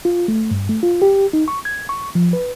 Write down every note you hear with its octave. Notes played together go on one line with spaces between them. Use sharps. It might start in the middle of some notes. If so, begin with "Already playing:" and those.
F4
A3
G2
A3
F4
G4
D#4
C#6
G#6
C#6
F3
B4